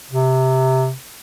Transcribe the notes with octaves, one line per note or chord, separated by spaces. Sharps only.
C3